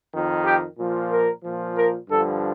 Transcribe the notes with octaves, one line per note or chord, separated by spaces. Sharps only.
F2 D#3
G4
A#2 F3
A#4
A#2 F3
A#4
G2 D3 F3 A4